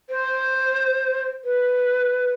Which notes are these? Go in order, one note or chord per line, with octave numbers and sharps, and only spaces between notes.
C5
B4